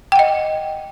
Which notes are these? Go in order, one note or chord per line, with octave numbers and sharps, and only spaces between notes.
D#5 F#5 G5